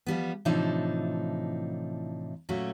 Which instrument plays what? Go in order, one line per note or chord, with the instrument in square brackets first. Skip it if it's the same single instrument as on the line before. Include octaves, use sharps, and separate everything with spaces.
[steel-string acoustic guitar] F3 G3 B3
A2 C3 E3 F3 D4 D#4
A#2 F#3 A3 C#4 F#4